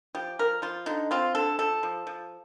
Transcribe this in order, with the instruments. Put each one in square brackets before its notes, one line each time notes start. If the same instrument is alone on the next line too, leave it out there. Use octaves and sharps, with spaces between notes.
[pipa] F3 G4
F3 A#4
F3 F4
D3 D#4
C4 F4
D3 A4
F3 A4
F3
F3